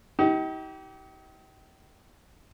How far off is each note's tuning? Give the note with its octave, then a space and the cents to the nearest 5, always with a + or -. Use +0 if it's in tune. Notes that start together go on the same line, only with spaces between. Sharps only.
D#4 +40 G4 -30